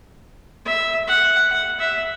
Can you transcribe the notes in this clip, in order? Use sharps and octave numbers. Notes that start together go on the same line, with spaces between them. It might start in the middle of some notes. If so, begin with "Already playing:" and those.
E5
F#5
F#5
E5